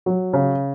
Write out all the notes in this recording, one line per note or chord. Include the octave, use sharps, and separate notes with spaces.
F#3
C#3